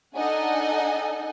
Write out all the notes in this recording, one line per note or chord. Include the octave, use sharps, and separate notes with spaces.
D4 D#4 A4 D#5 F#5 G#5